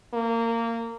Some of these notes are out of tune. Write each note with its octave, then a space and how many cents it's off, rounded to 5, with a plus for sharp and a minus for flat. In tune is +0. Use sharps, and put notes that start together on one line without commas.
A#3 -20